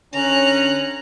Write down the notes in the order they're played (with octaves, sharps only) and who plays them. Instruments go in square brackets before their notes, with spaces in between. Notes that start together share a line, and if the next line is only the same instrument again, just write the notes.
[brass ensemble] D3 C#4 [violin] A#5 F#6